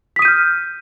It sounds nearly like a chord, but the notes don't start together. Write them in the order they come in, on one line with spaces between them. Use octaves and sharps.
B6 D#6 D#7 G6 F6